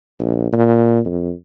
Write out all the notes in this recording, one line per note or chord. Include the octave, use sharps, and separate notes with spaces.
A#1
A#2
F2